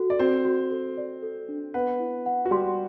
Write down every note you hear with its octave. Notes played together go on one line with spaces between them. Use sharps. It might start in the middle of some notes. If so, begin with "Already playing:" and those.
Already playing: F#4 A4
D5
C4 F#4 C5
F#4
A4
D5
A4
D4
B3 B4 F#5
E4
F#5
F#4
G3 G4 C6